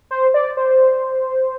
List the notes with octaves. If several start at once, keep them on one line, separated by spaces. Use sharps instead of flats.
C5
D5
C5